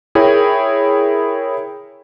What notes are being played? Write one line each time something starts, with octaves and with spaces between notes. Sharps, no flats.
E4 G#4 A#4 C#5 G5